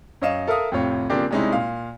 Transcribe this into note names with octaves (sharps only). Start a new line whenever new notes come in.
F#2 C#5 D#5 F5 E7
A4 A#4 E5 F5 D#6
F2 A2 C3 F4 C#5
C#3 F3 A#3 C4 D4 G4
C3 G3 G#3 C#4 D#4 E4
A#2 F5